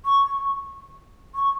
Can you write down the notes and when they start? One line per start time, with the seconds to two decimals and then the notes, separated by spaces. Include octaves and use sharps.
0.05 C#6
1.35 C#6